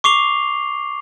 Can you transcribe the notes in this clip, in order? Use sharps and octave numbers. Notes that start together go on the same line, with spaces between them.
C#6 D6 C7 F7 G7